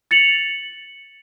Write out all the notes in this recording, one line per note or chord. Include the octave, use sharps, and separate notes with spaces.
A6 C#7 F7 F#7